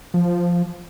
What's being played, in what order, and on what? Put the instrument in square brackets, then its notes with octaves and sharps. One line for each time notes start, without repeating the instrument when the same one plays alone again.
[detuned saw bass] F3